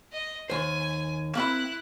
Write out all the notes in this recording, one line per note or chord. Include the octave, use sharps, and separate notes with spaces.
D#5
D#2 C5 G#5
A#3 C4 E4 B5 F#6